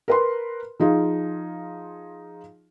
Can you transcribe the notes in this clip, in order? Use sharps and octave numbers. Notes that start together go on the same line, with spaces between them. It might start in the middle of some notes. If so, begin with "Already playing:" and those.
A#4 B4 C6
F3 D#4 F4 G#4